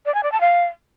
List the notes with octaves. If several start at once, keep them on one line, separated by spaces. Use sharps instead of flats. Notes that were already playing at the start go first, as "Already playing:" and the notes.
D5
G#5
D5
A5
F5